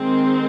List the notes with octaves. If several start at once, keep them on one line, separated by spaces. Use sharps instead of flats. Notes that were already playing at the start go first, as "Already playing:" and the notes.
Already playing: D#3 G#3 C4